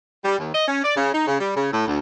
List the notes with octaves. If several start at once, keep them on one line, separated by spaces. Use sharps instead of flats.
G3
D#2
D#5
C#4
D5
C#3
D#4
C#3
G3
C#3
A2
D2